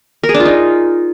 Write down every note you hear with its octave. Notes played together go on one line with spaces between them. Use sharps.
A#4
G#4
D4
F4
D#4